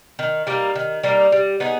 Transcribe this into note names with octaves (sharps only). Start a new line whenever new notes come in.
D#3
G3 A#3 D#4
D#3
G3 A#3 D#4
G3
B3 D#4 G#4